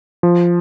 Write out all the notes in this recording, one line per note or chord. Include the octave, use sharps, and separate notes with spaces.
F3